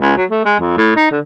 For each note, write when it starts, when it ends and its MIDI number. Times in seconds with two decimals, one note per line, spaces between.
0.02 0.14 37
0.17 0.25 54
0.31 0.43 57
0.46 0.58 56
0.60 0.77 41
0.78 0.92 45
0.97 1.10 63
1.12 1.19 50